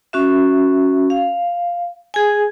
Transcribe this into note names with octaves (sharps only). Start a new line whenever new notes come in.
C#4 F#4 E5
F5
G#4 G#5